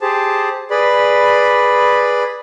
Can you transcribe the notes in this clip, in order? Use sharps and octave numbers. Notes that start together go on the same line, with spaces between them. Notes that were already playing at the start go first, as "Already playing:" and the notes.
G4 G#4 C5 A5
G#4 B4 D5 B5